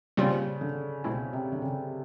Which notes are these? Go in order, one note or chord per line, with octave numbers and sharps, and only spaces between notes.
A#2 C#3 G3 C4 F4
D3
C#2 B2 G#3 C4 E4
C3
D3
C#3